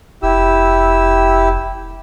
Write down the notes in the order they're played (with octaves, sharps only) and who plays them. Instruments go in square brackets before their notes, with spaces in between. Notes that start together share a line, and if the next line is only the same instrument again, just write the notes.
[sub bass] F1 [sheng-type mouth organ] E4 G4 E6